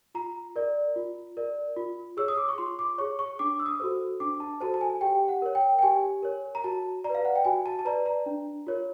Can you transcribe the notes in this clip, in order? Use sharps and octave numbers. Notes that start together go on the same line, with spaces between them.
F4 A#5
A#4 D5
F4
A#4 D5
F4
G#4 C#5 E6
D#6
D6
C#6
F4 C6
D6
G#4 C#5 C#6
C#6
D4 D6
E6
D#6
F#4 A4 C5
D4 D6
A5
F#4 A4 C5 A5
A5
G#5
G4 G5
F#5
A#4 C#5
G5
G5
G4 G#5
A#4 C#5
A#5
F#4 A5
D5 A#5
B4
F5
F#5
G5
F#4 G#5
A5
A5
B4 D5 A#5
A#5
D4
F4 A#4 C#5